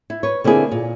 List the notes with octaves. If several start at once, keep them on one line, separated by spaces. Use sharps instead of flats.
E4
B4 C#5
D3 A#3 C4 E4 G#4
A#2